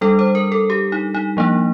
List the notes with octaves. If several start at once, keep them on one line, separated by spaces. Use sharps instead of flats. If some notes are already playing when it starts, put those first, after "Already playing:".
G3 D4 A4
C5
A#4
A4
G4
D#4
D#4
F3 A#3 D4